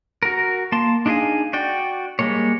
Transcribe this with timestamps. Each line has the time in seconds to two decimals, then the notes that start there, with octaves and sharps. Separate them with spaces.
0.23 F#4 A#4
0.72 A#3 A5 C6
1.06 D4 D#4 G#4 F5 G#5
1.53 F#4 D5 G5
2.19 G3 G#3 A#3 C#5